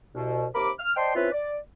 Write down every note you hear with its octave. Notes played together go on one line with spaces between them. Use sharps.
C2 B2
D#2 C3 A#4 B5 D6
F6
C5 D5 D#5 G5 A5 C6
C4 C#4 E4 F4 B4
D5